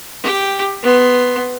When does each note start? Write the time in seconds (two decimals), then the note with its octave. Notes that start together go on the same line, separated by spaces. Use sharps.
0.23 G4 G5
0.83 B3 C6